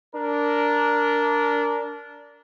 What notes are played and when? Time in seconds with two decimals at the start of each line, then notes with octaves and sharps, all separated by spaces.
0.14 D4 A#4